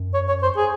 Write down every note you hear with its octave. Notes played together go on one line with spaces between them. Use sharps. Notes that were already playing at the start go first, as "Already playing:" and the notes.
Already playing: F#2
C#5
C#5
C5
G#4